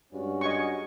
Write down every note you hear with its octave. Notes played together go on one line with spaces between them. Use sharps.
G2 G#3 C#4 F#4
D#5 G#5 C#6